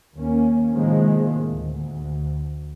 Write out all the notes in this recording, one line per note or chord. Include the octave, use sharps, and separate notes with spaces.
D#2 A#3 C#4
A2 C3 D#3 F3 G#3 A#3
D2